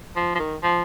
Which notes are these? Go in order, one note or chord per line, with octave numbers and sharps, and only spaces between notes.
F3
F3
D#3
F3